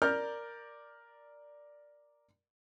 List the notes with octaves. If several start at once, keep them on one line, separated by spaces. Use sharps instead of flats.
A#4 D5 F6 G6